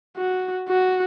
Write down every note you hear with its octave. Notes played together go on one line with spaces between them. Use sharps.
F#4
F#4